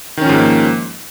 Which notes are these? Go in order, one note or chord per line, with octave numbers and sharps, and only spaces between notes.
G#2 D#3 F3 A#3 C#4